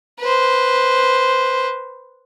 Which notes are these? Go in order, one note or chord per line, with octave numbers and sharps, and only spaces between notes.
B4 C5